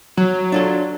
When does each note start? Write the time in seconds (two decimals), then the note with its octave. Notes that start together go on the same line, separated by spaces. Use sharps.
0.17 F#3 F#4
0.52 D4 F4 A4